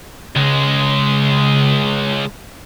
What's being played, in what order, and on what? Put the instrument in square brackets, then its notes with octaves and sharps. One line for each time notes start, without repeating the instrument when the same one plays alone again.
[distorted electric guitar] C#2 G#3 [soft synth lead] C#3